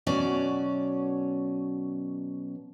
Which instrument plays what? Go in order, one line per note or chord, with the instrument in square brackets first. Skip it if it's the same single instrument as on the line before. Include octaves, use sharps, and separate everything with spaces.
[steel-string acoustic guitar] B2 F#3 C#4 D5